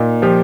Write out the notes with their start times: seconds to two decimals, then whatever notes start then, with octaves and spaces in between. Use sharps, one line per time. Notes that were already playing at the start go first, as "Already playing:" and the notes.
Already playing: A#2 D#4
0.22 F3 G4